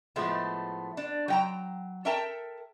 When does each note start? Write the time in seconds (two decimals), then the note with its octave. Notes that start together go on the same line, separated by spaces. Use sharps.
0.16 A2 F3 G#3 A3 B3
0.97 D4
1.28 F#3 G5 A#5
2.05 A4 A#4 E5 G5 A5 A#5